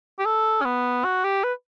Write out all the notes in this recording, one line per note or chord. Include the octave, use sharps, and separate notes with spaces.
G4
A4
C#4
B3
F#4
G4
B4